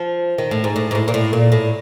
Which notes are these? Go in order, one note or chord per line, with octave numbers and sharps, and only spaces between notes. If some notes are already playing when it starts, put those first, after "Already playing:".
Already playing: F3
D#3
A2
G#2
A2
G#2
A2
A#2
A2
A#2
A2